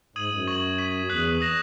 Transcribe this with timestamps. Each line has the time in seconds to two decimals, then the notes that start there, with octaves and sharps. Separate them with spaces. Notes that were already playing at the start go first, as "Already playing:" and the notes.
0.16 G#2 D#6 G#6 D#7 F#7
0.32 F#2
0.47 C#6 G#6 D#7 F#7
0.78 C#6 G#6 B6 D#7
1.09 E2 D#6 F#6 B6 F#7
1.41 D#6 A#6 E7